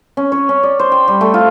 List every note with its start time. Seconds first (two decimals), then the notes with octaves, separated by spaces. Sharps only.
0.17 C#4
0.32 C#5
0.49 C#4
0.63 D5
0.79 C5
0.92 G5
1.08 G3
1.21 A3
1.34 F4